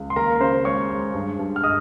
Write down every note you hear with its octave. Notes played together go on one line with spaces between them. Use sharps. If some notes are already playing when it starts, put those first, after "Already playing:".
Already playing: C#2
C6
D#2 A#4 A#5
C#3 C5 C6
G#3 C#5 C#6
G#3
G2
G2
F6
D#5 D#6